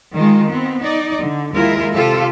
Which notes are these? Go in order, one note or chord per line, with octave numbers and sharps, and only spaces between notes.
D#3 G#3 D#4 F4
B3 C4
D#4 D5
D3
D#2 G#3 E4 F4 A#4
C3 F4 G4 A4 F5